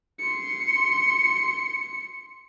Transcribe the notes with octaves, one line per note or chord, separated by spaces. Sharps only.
C6 C#7